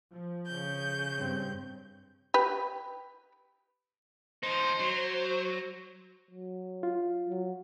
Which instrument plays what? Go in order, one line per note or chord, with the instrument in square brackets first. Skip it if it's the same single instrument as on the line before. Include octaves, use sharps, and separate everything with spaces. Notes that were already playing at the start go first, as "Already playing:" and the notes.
[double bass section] F3
[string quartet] C#3 G6
[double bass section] G2 C4
[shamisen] G4 B4
[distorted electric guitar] F3 D#4 [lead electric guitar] C5
[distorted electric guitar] F#3
[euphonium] F#3
[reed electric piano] F4
[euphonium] F#3